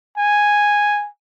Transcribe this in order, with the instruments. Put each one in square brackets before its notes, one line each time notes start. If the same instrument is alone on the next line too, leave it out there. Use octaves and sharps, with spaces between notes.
[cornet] G#5